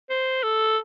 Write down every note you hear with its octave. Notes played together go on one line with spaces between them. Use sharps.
C5
A4